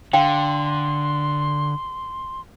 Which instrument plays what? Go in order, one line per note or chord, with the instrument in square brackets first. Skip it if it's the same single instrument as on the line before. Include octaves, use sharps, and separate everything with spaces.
[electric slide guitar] D3 [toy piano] F5 G5 [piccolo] C6